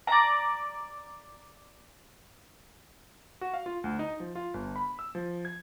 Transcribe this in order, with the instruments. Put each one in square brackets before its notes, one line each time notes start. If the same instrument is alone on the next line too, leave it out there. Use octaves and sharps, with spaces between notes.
[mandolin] D5 A#5
[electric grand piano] F#4
F5
F4
D2
D#4
F3
F4
G1
B5
E6
F3
G#6